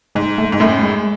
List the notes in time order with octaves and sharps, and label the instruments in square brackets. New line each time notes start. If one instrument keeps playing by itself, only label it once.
[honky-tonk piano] G#2 [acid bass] G#3
[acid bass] A3
[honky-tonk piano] G#2 [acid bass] G#3
[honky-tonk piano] F#2 A2 [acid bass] A3
[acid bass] G#3